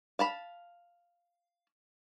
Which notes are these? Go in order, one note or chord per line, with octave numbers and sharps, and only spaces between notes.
F5 A5 B5